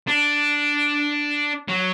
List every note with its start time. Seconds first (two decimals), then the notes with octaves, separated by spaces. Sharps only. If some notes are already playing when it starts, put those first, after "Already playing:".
0.08 D4
1.68 F#3